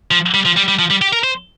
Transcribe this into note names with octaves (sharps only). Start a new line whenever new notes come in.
F3
G3
F3
G3
G3
F3
G3
G4
A#4
C5